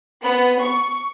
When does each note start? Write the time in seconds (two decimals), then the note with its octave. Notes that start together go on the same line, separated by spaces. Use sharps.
0.22 B3
0.59 C#6